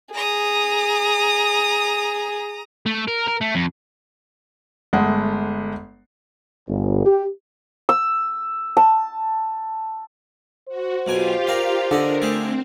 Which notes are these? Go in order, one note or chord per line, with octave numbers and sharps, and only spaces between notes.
G#4 A#5 D#6
A3
A#4
A#4
A3
F2
G1 G#3 A3 F#5
G1
G4
E6
A5
F#4 C5
B1 B2 F4 G4 F5 G#5
A#4 D5
D3 D4 A#4 D5 D#5
A3 C4 G4 G#4